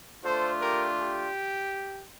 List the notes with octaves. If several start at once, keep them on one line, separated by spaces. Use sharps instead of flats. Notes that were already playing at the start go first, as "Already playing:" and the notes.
A3 D4 F4 A4 C5
G4 A#4
G4